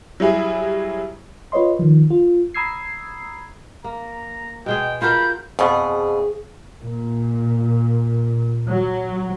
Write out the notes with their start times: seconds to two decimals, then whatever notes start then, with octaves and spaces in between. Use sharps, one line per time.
0.20 F#3 G3 E4 G#4
1.52 F4 B4 C#5 D#5 C6
1.79 D#3 F3
2.10 F4
2.54 A#5 B5 D#6 E6 G#6 C7
3.84 A#3 A#5
4.66 B2 G#3 G#4 G5
5.02 F4 F#4 A#4 B5 G6
5.59 F2 B2 G#4
6.81 A#2
8.67 F#3